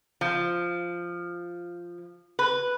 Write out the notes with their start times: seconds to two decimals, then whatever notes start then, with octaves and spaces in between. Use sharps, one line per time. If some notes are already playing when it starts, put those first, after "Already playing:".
0.21 F3
2.39 B4